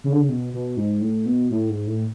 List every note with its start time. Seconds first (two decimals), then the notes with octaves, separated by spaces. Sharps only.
0.04 C#3
0.12 D3
0.20 C#3
0.29 B2
0.54 B2
0.77 G#2
1.01 A2
1.26 B2
1.51 A2
1.70 G#2
1.87 A2